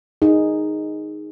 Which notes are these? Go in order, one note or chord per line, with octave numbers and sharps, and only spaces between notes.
D#4 G#4